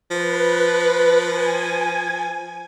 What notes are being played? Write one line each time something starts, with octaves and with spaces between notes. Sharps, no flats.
F3 B4
G#5